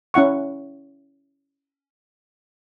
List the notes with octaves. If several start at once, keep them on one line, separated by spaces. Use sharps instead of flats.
C#4 E4 F#5 C#6